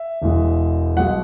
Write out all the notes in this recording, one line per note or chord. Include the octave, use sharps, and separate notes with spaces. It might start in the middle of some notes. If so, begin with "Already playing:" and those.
Already playing: E5
E1 E2 E3 G#3
B1 B2 G#3 F#5